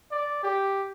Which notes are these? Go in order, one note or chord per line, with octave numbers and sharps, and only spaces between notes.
D5
G4